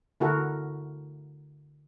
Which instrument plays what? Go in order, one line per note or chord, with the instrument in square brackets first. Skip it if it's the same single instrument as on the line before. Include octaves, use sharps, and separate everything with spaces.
[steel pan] D3 E4 F#4 A4 A#4